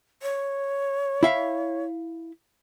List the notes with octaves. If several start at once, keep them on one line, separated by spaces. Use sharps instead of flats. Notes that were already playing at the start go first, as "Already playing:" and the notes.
C#5
E4 E5 F5